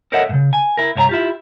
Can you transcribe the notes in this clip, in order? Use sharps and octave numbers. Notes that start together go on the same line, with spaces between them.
A4 A#4 C#5 D#5 E5 F#5
G2 C#3
G#5
E4 A#4
C2 G2 C#5 G#5 A#5
E4 F4 G4